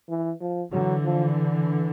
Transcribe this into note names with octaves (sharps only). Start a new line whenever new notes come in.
E3
F3
D3 E3 F#3
F3